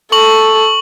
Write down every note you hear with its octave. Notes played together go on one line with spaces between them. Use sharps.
A4 C#6 F#7